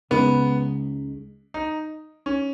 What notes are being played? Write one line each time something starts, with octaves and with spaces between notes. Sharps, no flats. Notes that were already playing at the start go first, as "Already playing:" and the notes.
C#2 C#3 G#3 B3 D#4
D#4
C#4